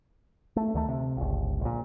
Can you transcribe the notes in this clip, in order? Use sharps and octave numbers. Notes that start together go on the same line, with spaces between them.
A3
D2 D#3 A3
C3
G1 C#2
A#1 A#2